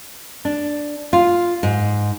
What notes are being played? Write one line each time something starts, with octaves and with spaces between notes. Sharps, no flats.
D4
F4
G#2